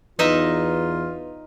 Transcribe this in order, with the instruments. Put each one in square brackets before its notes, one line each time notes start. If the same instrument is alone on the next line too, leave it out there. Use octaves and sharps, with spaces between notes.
[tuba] E2 [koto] D#4 D#5 E5 [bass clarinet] F4 [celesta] B4